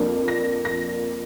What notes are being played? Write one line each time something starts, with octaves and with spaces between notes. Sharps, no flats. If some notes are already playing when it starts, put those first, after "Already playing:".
Already playing: F2 F3 A#3 D4
A#6
A#6